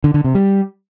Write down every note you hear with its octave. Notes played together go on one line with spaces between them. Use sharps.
D3
D3
C3
G3